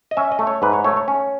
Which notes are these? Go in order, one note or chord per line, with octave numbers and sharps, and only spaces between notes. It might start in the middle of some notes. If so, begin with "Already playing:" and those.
D#5
C#4 E5
D#5
A3
C#5
G#2 B4
C#5
A3 C#5
C#5
C#4